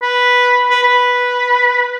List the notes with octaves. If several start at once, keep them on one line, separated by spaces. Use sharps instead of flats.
B4
B4
B4